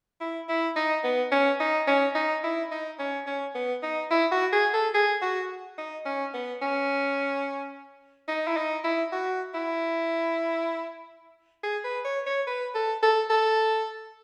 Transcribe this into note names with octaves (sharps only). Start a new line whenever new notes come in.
E4
E4
D#4
B3
C#4
D#4
C#4
D#4
E4
D#4
C#4
C#4
B3
D#4
E4
F#4
G#4
A4
G#4
F#4
D#4
C#4
B3
C#4
D#4
E4
D#4
E4
F#4
E4
G#4
B4
C#5
C#5
B4
A4
A4
A4